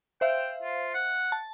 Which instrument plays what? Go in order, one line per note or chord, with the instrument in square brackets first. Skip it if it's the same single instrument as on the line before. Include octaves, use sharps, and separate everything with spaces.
[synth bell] C5 E5 F5 [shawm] G5
[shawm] F4
F#5
[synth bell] A5